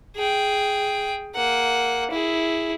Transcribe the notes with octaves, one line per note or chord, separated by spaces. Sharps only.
G#4 G5
A#3 F#5
E4 G#4